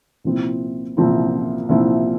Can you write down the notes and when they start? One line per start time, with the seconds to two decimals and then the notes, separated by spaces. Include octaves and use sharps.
0.24 C2 A#2 F3 C4 E4
0.97 C2 A#2 F3 C4 E4
1.69 C2 A#2 F3 C4 E4